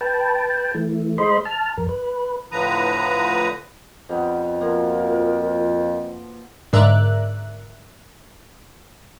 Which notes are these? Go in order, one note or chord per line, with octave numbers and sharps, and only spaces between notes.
B4 G5 A5
E3 A3
G#3 C5 D#5 B5 C6
A5 F6
F2 A#4
B4
A2 D3 F3 B4 A#5 D#6
F2 G3 B3
B2 F3 A#3 A#4
G#2 D3 A#4 D5 E5 F#6